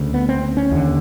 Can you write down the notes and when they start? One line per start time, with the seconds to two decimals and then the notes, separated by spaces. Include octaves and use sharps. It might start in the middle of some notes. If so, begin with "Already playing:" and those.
Already playing: D2 C#3
0.14 B3
0.29 C4
0.57 C#4
0.71 D#2 D3